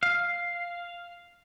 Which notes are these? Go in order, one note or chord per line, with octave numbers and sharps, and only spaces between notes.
F5